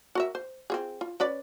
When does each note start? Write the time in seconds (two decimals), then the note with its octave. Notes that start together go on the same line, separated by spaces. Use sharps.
0.15 F#4 A#4 E5
0.35 C5
0.70 C4 F4 G#4
1.01 F4
1.20 C#4 B4 D5